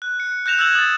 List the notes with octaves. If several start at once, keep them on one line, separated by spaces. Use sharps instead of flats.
F#6
C#7
F#6 G6 A#6 E7 F7
E6 F#6 G#6 F#7
D#6 A6